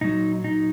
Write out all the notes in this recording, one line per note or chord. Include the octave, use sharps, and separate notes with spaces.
A#2 F#3 D#4
D#4